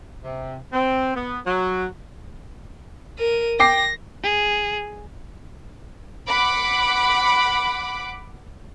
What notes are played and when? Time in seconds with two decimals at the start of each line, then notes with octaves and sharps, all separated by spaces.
0.23 C3
0.73 C4
1.15 B3
1.45 F#3
3.18 A#4 D#7
3.60 G5 D6 A#6 C7
4.23 G#4
6.28 F#5 B5 D6